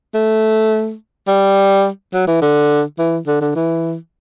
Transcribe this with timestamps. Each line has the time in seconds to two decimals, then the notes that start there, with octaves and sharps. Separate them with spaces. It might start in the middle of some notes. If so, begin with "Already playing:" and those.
0.14 A3
1.27 G3
2.13 F#3
2.27 E3
2.42 D3
2.98 E3
3.27 D3
3.41 D3
3.55 E3